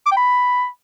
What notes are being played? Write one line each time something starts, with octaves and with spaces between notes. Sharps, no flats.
D6
G5
B5